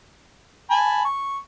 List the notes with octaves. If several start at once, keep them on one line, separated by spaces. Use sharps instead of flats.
G#5 A5 B5
C#6